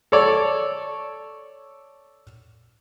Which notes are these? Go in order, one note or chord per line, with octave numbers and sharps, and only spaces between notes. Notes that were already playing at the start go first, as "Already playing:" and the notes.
A4 C#5 D5